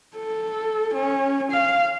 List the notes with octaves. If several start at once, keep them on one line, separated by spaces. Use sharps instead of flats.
A4
C#4
F5